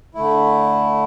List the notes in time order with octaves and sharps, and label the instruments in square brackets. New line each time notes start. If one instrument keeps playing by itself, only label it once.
[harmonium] D3 A3 E4